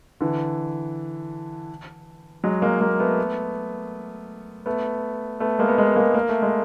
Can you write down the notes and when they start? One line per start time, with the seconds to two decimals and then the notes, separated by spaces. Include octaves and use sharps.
0.20 D3 E3
2.44 F#3 G#3
2.62 G#3 A#3
2.81 G#3 A#3
3.00 A3 B3
4.66 A3 B3
5.40 A3 B3
5.59 G#3 A#3
5.69 B3
5.77 G#3 A#3
5.88 B3
5.96 G#3 A#3
6.14 A#3
6.29 A3
6.42 G#3